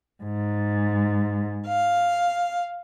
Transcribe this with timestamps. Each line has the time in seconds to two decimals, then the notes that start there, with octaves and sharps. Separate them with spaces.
0.23 G#2
1.66 F5